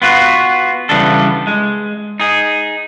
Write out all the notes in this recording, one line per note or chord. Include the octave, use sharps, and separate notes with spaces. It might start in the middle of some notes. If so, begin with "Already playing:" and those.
B3 F4 F#4
C#3 E3 G3 B3 D4 A4
G#3
D#4 G#4